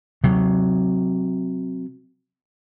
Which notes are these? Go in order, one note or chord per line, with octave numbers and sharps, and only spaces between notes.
C3 F#3